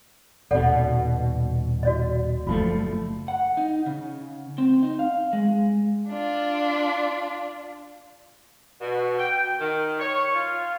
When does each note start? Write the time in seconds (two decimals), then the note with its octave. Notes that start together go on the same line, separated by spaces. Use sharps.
0.51 D#1 B2 A4 D5 F#5
1.83 F#4 D5 D#5
2.47 F#1 F3 A3 F4
3.28 F#5
3.57 D#4
3.86 C#3
4.58 C4
4.83 D#4
4.99 F5
5.33 G#3
6.08 D4 F4
8.80 B2
9.18 G5
9.60 D#3
10.00 C#5
10.34 F4